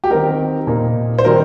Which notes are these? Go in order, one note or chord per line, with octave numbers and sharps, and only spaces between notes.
G4
D#3 C4 D#4 A#4
A#2 A#3 D#4
C5
D#3 G3 C4 D#4 A#4